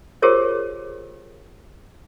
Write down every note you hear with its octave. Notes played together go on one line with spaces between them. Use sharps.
F4 G4 G#4 A#4 C5 C#5